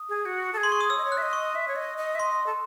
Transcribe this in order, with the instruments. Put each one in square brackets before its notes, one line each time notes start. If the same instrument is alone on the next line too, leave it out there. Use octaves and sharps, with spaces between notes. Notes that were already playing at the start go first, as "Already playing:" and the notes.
Already playing: [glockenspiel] D#6
[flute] G#4
F#4
A4
G#4
[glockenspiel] C6
C#6
D#6
[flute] C#5 [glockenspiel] E6
[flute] D#5
C#5
[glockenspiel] F#6
[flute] E5
D#5
[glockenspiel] C#6
[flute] E5
C#5
D#5
D#5
E5
[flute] D#5 [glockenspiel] C6
[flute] A4